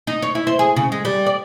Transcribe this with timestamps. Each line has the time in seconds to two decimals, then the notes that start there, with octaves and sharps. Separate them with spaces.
0.07 D#4
0.22 C#5
0.35 E4
0.47 C5
0.59 G#4
0.76 C#3
0.92 G#3
1.05 G3
1.26 D5